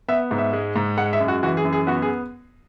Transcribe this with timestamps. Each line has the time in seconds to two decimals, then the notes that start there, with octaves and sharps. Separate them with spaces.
0.08 B3 E5
0.31 G#2
0.38 E5
0.53 G#3
0.76 G#2
0.97 G#3 F#5
1.13 E5
1.20 F#2
1.28 F#4
1.43 E3 F#4
1.57 G#4
1.64 F#2
1.73 G#4
1.87 B3 F#4
2.02 G#4